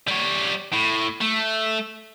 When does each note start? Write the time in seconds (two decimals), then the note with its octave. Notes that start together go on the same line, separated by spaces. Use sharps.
0.08 G3 C#5
0.73 A2
1.21 A3